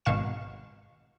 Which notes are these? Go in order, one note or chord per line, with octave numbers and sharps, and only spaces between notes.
G#1 B2 F5 C#6 E7